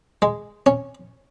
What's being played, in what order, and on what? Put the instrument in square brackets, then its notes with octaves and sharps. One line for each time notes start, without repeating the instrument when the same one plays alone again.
[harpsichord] G#3
C#4